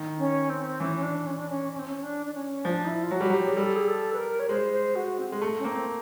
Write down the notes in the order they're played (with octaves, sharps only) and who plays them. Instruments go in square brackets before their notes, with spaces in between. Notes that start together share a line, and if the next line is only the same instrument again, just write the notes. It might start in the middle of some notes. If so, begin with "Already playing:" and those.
Already playing: [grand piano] D#3
[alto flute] C#4
C4
[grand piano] E3 [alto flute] C#4
[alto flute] C#4
D4
C#4
D4
C#4
C#4
C4
C#4
D4
D4
C#4
[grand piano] F3 [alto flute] D4
[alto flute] D#4
E4
F4
[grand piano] F#3 [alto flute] F#4
[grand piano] G3
F#3
[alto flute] G4
G#4
[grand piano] G3 [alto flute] A4
[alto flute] G#4
A4
B4
A#4
C#5
[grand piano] G#3 [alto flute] C5
[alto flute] C5
F#4
C4
[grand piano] G#3
A3
[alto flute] C#4
[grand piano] A#3 [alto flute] C4